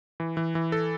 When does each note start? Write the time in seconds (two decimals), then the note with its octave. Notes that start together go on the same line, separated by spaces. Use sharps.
0.20 E3
0.37 E3
0.55 E3
0.72 A4